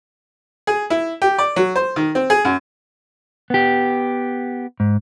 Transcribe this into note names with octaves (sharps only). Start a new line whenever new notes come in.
G#4
E4
G4
D5
F#3
C5
D#3
C4
G#4
F#2
B3 G4
G#2